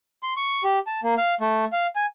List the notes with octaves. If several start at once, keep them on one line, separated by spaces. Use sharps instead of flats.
C6
C#6
G4
A5
A#3
F5
A3
F5
G#5